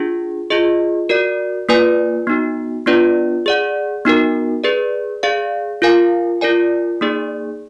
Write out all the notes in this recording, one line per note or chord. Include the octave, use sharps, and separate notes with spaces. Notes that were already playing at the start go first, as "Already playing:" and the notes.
Already playing: D4 F4 G#4
F4 G#4 D#5
F#4 A#4 D5
A#3 F4 B4 D5 G#5
B3 D#4 F#4
B3 D4 F4 B4 D5
G#4 D5 F#5
B3 D#4 F#4 A#4
G#4 B4 D5
G#4 D5 F5
F4 A#4 F5 G#5
F4 A#4 D5 G#5
A#3 D#4 G#4 D5